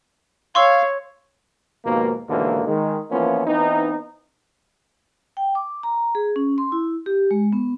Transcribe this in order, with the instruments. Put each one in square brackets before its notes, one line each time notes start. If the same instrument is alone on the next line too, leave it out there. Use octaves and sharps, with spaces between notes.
[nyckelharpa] C#5 [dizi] F5 [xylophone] C6 C#6 E6
[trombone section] D#2 G#2 B2 F3 A#3
D#2 G#2 B2 D3 E3 A#3
D#3 G#3
E3 F3 A#3 B3 C#4 F4
E3 B3 C4 D#4
[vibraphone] G5
D6
A#5
G#4
C#4
C6
E4
G4
G#3
B3